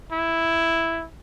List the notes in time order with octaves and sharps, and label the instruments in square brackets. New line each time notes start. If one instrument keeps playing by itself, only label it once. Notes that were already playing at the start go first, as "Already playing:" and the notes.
[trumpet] E4